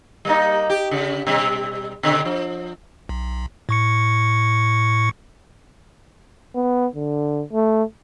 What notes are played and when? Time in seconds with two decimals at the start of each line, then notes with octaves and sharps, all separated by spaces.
0.25 G3 A#3 D#4
0.70 G4
0.91 C#3
1.27 B2 G3
2.03 B2 D3
2.25 F3
3.09 B1
3.69 A2 C#6 C#7
6.55 B3
6.95 D3
7.53 A3